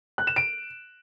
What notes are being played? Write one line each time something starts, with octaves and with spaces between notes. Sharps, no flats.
F#6
E7
D7